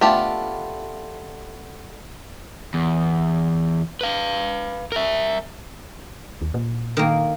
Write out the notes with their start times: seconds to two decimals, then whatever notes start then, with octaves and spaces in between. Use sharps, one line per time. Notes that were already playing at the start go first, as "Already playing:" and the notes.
0.01 A3 B3 D4 F4 G4
2.74 E2
4.01 B4 F5
4.92 A#4 E5
6.42 D#2
6.54 A#2
6.97 D#3 A#3